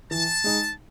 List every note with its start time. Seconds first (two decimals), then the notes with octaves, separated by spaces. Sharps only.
0.11 E3 A5
0.44 G#3 D#4